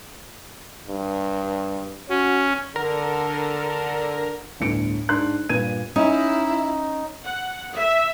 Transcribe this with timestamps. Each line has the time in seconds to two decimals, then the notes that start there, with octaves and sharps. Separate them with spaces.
0.88 G2
2.10 C#4 F#4
2.76 D3 A#4
4.60 G1 D2 A2 C#7 D7
5.09 G#2 D4 C6 F#6
5.49 G2 A#2 B4 G#6 D#7
5.96 C#4 D#4 E4 C#6
7.26 F#5
7.76 E5